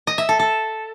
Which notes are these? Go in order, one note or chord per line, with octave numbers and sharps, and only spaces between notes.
D#5
E5
A4
A4